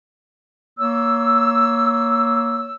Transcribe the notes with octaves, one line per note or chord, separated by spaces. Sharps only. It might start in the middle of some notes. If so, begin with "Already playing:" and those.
A#3 C#5 E6